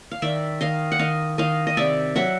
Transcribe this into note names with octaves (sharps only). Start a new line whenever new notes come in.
F5
D#3 D5 E5
D#3 D#5 F5
F#5
D#3 D#5 F5
D#3 D#5 F5
D#5
C3 D5 E5
F#3 E5 F#5